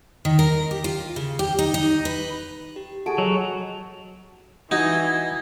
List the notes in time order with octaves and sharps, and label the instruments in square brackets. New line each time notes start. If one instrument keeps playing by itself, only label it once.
[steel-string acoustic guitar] D#3
A#4
G4
F4
C#3
G4
D#4
D#4
B4
[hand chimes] G4
[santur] F#4 G#4 [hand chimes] A4 A5 D7
[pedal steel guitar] F#3 [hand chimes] C#5 D#5
[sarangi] E3 [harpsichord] D#4 [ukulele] F#4 [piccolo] G#6